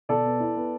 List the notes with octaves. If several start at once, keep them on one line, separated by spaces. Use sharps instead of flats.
B2 A4 D5
B3
E4
B3